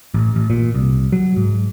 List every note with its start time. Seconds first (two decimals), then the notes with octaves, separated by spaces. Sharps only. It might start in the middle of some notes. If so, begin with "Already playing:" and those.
0.14 A1
0.36 A1
0.50 A#2
0.74 C2
1.12 F#3
1.37 G#2